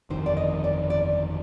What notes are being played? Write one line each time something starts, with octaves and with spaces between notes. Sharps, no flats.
G1 F2 D#3 C5
D5
D#5
D5
D5